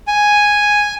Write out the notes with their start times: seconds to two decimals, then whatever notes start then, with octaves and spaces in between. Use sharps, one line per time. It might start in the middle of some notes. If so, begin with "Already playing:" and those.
0.07 G#5